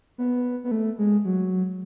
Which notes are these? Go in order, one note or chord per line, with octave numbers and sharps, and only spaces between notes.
B3
B3
A3
G#3
F#3